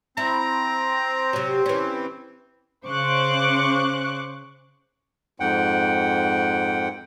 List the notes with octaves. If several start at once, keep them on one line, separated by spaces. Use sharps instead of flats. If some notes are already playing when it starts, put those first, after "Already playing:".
C4 E4 A#5
C3 F#3
E3 C#4
C#3 C5 C#6 D6 F#6
F2 G#2 F#5 G5